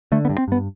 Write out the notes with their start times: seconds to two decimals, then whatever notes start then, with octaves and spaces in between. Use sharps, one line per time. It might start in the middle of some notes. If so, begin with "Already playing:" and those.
0.12 D3 A3
0.25 B3
0.29 G2
0.38 C4
0.48 G2 B3